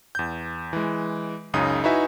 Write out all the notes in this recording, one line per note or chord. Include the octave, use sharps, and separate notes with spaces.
E2 G6
E3 G#3
C#2 F#2 C#3 D#4 D#6
D#4 E4 F#4 B4 E5 G#5